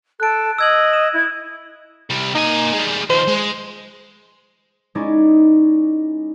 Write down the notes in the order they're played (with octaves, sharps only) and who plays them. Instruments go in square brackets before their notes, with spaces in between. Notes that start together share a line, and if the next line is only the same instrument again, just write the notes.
[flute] A4 [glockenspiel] F#6 D7
[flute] D#5 [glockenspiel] E6 G#6 F#7
[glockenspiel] E7
[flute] E4
[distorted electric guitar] C3 G3
[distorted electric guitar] A#3 G#5 [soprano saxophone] D#4
[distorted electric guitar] G3 G#3
[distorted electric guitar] D#3 F3 [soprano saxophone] C5
[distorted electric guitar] G#3
[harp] G#3 C#4 D#4 E4 G#4 D5